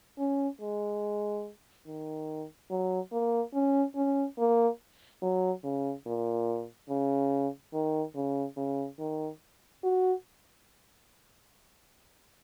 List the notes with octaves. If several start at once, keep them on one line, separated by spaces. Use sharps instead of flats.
C#4
G#3
D#3
F#3
A#3
C#4
C#4
A#3
F#3
C#3
A#2
C#3
D#3
C#3
C#3
D#3
F#4